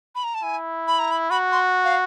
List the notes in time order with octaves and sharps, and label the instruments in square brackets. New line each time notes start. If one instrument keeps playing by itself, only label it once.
[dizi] B5
A#5
A5
[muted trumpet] E4 [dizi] G#5
[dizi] B5
A#5
B5
[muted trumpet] F#4 [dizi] B5
[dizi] C6
F5